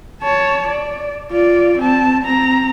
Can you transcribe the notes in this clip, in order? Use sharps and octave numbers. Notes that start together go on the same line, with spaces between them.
C#5 A5
D5
F4 D5
C4 A5
C4 A#5